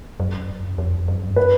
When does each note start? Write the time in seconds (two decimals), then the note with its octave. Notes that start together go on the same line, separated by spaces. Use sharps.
0.20 F#2
0.78 F2
1.08 F#2
1.27 G2
1.36 B4